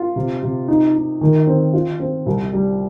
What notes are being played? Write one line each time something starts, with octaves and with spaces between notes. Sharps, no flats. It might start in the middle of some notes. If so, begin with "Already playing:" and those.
Already playing: F4
C3
C3
D#4
D#4
D#3
C4
F4
C4
C2
G3